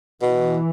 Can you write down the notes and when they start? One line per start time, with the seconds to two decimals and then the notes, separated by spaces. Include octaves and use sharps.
0.22 B2 E3